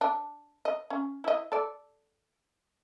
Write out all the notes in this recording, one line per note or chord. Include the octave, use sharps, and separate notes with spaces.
D4
D#5
C#4
E4 D#5
A4 D5